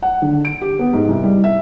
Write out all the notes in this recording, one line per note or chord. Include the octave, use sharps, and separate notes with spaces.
F#5
D3
D7
G4
B3
G#2
C2
G3
E5